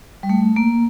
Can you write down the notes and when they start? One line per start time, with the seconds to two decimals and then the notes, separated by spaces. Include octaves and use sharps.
0.23 G3
0.29 A3
0.56 A#3